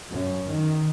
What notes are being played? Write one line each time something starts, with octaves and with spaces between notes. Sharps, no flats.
F#2
D#3